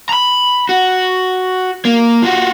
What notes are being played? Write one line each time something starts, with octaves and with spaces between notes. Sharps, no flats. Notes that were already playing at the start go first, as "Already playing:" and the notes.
A#5 B5
F#4
A#3
F4 F#4